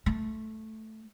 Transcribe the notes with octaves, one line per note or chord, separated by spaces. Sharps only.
A3